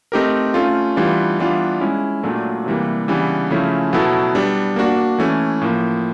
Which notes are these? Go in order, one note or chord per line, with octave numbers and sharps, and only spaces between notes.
A3 C4 D#4 G4 A#4
A3 C#4 F4
E3 G3 B3 D4 F4
E3 G3 B3 D4 F4
G#3 C#4 E4
A#2 F#3 A3 D4
C3 E3 G3 A#3
C#3 E3 G3 B3 D4
C#3 F3 A3 C#4 E4
B2 F#3 B3 E4 A4
G3 B3 D4
A#3 D4 F#4
E3 A3 C#4
A2 F3 A#3